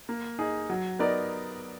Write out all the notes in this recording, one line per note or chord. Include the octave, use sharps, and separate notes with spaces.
A#3
D#4 G#4
F#3
B3 D#4 A#4 D5